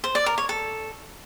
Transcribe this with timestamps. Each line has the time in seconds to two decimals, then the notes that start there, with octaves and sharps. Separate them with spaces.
0.04 C5
0.15 D5
0.26 A#4
0.38 C#5
0.49 A4